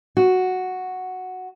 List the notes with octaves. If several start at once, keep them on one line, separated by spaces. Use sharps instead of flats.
F#4